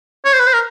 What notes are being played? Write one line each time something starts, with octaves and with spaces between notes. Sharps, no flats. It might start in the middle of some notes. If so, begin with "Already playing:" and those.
C#5
C5
B4
C5
A#4